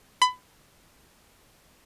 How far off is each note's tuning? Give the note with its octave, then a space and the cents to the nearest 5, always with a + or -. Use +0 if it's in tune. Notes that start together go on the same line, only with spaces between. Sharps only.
B5 +25